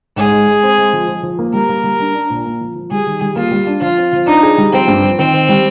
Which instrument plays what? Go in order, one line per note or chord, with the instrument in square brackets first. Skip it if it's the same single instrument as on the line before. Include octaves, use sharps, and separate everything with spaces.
[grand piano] G#2 [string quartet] G#4
[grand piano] G#3
G#3
C4
G#3
F3
F3
F3
A#3
[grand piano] G3 [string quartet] A#4
[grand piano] A#3
G3
D4
D4
A#2
A#3
F3
F3
[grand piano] G3 [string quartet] G#4
[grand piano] D#3
G3
[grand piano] A#3 [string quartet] F4
[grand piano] G3
D4
[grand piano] F3 [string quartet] F4
[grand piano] C4
F3
[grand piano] D4 [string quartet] D#4
[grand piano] G#4
G3
[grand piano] F3 [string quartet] C4
[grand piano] G2
F3
[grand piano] D#3 [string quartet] C4
[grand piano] D#3
G3